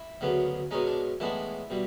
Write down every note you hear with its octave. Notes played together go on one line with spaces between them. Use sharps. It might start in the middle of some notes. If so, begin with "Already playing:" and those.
Already playing: E4
D2 C#3 F#3 B3
B2 G#3 C#4 D#4
D4
A2 E3 G#3 B3 D4 E4
B2 G3